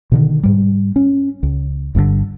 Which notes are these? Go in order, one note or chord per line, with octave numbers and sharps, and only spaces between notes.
B2 D3 D#3
G#2 G3
C#4
C#2
G1 G2 A#2 D3